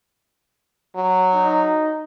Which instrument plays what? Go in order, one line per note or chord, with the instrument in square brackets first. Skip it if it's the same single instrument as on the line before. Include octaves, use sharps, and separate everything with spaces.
[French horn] F#3
[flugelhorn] D#4